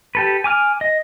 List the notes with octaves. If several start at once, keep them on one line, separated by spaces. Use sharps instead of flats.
G4 A4 B4
G#5 D6 F6
D#5